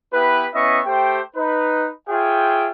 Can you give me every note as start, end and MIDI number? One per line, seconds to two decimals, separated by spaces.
0.13 0.46 59
0.13 0.46 64
0.13 0.46 67
0.13 0.46 71
0.54 0.80 59
0.54 0.80 61
0.54 0.80 64
0.54 0.80 75
0.54 0.80 76
0.54 0.80 85
0.86 1.21 57
0.86 1.21 67
0.86 1.21 72
0.86 1.21 79
1.36 1.88 63
1.36 1.88 71
2.09 2.71 65
2.09 2.71 68
2.09 2.71 73
2.09 2.71 76
2.09 2.71 79